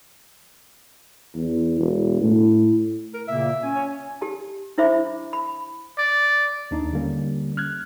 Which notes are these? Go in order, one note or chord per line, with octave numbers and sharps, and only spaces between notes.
E2
E1
A2
A#4
A#2 C#3 A#3 E5
C#4 G#5
C#5
G4 A5
D4 E4 C5 E5 B5 D6
B5
D5
D#2 D4 D#4
D3 G3 A#3 C#4
F6 F#6 G#6